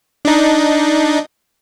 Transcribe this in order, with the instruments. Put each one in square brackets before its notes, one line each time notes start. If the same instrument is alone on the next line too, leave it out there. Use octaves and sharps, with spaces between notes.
[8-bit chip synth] D4 D#4